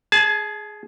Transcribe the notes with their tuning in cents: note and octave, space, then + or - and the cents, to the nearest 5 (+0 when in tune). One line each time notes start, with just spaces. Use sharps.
G#4 +5 A5 -35